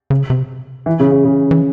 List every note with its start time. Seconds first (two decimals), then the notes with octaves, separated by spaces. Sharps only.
0.10 C#3
0.30 C3
0.86 E3
1.00 C#3
1.11 C#3
1.25 C#3
1.51 E3